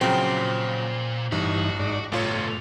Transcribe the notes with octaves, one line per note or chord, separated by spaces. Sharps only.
A#2 C#3 F3 F#3 C4
A1 G2 E3 D#4 F#4
G#2 D#4 D5
G1 A2 C3 F#3 F4 C#5